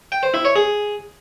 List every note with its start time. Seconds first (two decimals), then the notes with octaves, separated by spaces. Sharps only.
0.12 G5
0.23 C5
0.34 E4
0.45 C#5
0.56 G#4